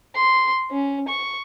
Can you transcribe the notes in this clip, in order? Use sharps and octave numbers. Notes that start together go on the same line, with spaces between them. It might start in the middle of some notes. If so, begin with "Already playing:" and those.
C6
C#4
C#6